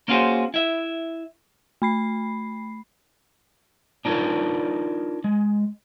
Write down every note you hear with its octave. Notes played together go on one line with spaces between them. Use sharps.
A#3 C#4 F4 F#4 G#4 C5
E4 E5
A3 B5 C7
D4 D#4 F4 A#4 C#5
G#3